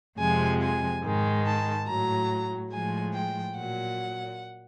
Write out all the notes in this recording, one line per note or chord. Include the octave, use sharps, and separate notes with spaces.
F2 C3 F3 G#3 G#5
G#5
G#2 D#3 G#3
A5
A2 F#3 A#5
A2 F3 G#3 G#5
G5
A#2 F#3 F#5